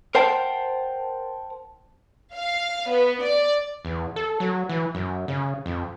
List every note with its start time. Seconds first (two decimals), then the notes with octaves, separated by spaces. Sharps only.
0.15 A#4 C5 F#5 G5 A5
2.34 F5
2.91 B3
3.22 D5
3.85 E2
4.16 A4
4.40 F#3
4.69 E3
4.95 F#2
5.28 C#3
5.66 F2